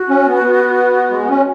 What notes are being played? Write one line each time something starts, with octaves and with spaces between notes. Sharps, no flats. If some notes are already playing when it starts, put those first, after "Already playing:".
Already playing: F#4
C#4
B3
B3
G#3
B3
C#4